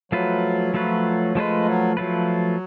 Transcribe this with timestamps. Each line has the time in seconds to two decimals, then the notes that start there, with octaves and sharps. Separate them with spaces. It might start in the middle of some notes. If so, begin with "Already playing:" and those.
0.12 F3 F#3 A3 F4 B4
0.74 F3 A3 F4 B4
1.35 F3 G#3 A3 F4 B4
1.65 F#3
1.97 F3 F#3 A3 F4 B4